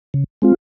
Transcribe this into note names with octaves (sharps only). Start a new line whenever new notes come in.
C#3
G#3 C4 F4